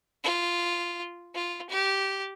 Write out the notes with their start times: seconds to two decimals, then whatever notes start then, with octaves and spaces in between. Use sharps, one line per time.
0.24 F4
1.35 F4
1.70 G4